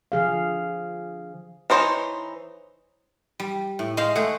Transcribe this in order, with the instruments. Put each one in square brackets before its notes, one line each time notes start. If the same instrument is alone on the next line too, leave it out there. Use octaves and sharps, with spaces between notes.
[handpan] D3 F3 G#4 F5
[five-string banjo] E3 D#4 C5 C#5
[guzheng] G3
A2
[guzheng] G#3 C5 F5 [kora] D#5
[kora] A3 [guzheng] G#4 F#5